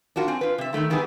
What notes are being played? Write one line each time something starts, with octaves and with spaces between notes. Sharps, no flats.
D4 F4 F#4 A#4
C4 G#5
F4 B4
C3 E5
D#3 E3 A3 E4
D#3 E3 G3 B3 G#4